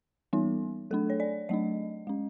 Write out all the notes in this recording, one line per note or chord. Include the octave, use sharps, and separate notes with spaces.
E3 G3 B3 D#4
F#3 A3 D4 A4
C#5
D5
F#3 A3 D4 D#5
G#3 C#4